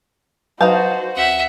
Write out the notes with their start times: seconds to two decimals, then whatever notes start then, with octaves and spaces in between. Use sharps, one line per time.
0.61 F#3 D#4 F#4 B4 C5 F5 A5 G6
1.17 D2 E5 F#5